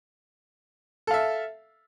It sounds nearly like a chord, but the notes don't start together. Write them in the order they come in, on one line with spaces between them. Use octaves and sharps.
A4 F5 E5